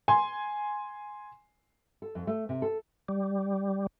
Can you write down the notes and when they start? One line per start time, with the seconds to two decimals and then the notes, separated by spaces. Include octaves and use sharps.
0.08 G#5 C6
2.02 A4
2.15 F2
2.27 A3
2.49 C3
2.62 A4
3.09 G3